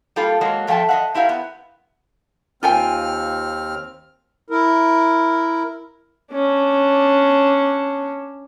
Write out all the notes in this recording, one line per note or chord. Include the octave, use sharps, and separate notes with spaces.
G3 A#3 F4 A4
F#3 G#3 A#3
E2 F3 A3 G5 A5
D#5 E5 F#5
C4 E4 G4 A#4 F5
B3
D#2 C4 F4 G5 G#5 F6
E4 A#4
C#4 D4